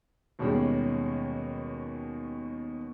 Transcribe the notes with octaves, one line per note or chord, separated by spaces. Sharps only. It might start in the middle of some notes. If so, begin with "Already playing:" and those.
D#2 B2 G3 G#3 C#4